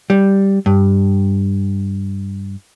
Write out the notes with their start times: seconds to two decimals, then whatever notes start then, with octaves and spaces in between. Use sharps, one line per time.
0.10 G3
0.66 G2